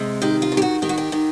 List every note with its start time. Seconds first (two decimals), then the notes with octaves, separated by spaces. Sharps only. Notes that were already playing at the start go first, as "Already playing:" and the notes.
Already playing: C3 G#3
0.22 D#3 G4
0.42 F4
0.52 D#3
0.57 G4
0.62 F#4
0.82 D#3 G4
0.89 F#4
0.98 G4
1.12 D#3